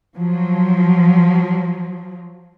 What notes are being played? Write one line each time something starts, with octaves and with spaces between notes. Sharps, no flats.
F3 F#3